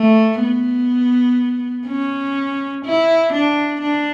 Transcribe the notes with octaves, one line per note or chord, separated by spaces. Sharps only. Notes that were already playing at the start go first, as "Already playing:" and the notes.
Already playing: A3
B3
C#4
E4
D4
D4